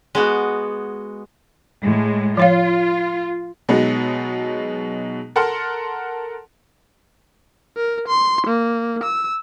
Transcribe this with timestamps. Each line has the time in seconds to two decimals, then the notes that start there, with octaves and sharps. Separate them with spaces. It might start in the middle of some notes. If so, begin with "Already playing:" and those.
0.15 G#3 B3 F#4
1.83 A2 G#3
2.37 F3 F4 C#5 F5
3.69 B2 F#3 G#3 B3 D#4
5.36 A4 A#4 F#5 A5 C6 F6
7.77 A#4
8.08 C6
8.47 A#3
9.04 E6